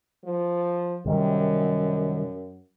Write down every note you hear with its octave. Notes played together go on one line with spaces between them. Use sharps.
F3
F#2 C3 D#3 G3